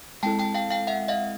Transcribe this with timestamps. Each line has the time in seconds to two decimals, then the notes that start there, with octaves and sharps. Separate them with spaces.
0.23 G#3 C4 E4 A4 G5 A5
0.39 G5 A5
0.54 F5 G5
0.70 F5 G5
0.87 E5 F#5
1.08 D#5 F5